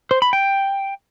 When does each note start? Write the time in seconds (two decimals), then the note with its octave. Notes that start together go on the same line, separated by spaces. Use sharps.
0.11 C5
0.22 B5
0.33 G5